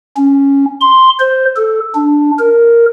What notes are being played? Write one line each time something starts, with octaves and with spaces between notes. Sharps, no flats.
C#4
C6
C5
A4
D4
A#4